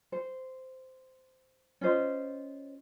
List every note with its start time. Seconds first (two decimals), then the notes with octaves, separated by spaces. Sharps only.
0.12 C5
1.81 C#4 F4 C5 D#5